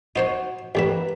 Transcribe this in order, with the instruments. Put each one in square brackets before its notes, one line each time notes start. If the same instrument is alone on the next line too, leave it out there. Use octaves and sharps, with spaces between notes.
[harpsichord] D#4 C5 C#5 [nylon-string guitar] F#4
[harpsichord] A1 D3 E5 [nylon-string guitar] G4 A#4 B4